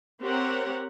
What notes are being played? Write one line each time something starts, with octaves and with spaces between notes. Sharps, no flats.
C4 G4 A#4 C#5 F#5